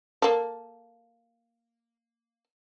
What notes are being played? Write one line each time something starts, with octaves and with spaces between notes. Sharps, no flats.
A#3 A4